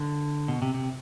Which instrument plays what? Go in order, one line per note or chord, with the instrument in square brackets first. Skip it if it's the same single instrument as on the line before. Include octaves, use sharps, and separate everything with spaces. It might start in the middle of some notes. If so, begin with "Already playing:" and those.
Already playing: [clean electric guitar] D3
B2
C3
C3